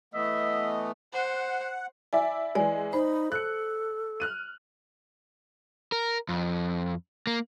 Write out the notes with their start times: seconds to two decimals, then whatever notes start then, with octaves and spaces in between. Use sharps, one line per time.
0.14 E3 A3 B3 D#5 E5
1.13 C5 F#5
2.13 E4 D5 E5 G#5
2.55 E3 G#3 D5 G#5
2.93 D#4 C5 B5
3.32 A4 F#6 C#7
4.20 F6 F#6 D#7
5.92 A#4
6.29 F2
7.27 A#3